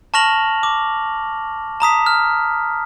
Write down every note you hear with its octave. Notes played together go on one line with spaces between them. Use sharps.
A5 C#6 F6 A#6 F7 F#7
D6
A5 A#5 D#6 B6
F6